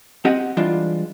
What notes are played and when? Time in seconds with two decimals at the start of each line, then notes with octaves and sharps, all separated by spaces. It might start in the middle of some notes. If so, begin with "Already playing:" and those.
0.25 C4 G4 D#5 F#5
0.57 E3 G3 G#3 D4 F4